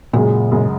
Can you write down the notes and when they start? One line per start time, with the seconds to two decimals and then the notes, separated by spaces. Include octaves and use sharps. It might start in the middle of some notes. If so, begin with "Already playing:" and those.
0.13 F#2 A#2 C#3 G#3
0.51 F#2 C#3 G#3